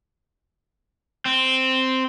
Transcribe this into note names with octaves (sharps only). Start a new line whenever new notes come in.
C4